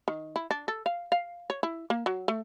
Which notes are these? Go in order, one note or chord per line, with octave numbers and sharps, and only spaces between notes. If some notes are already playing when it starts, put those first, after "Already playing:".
D#3
E4
D4
A4
F5
F5
C#5
E4
A#3
F#3
A3